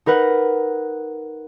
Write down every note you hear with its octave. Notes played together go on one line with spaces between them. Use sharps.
D#4 A#4 B4 F#5